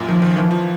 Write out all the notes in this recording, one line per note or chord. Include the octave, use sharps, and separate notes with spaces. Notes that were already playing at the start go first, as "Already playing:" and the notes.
Already playing: F#2 A#2
D#3 F3
D#3
E3 F3
F3